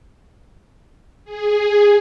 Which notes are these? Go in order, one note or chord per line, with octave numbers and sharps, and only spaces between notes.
G#4